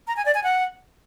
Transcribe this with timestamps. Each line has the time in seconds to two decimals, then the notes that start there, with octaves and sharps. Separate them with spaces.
0.08 A#5
0.17 G#5
0.26 D5
0.35 G#5
0.44 F#5